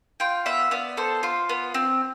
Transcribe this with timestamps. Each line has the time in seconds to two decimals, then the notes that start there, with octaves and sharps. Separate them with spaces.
0.20 F4 G5
0.46 B3 E5
0.71 B3 D5
0.97 A4 C5
1.23 F4
1.49 B3
1.74 C4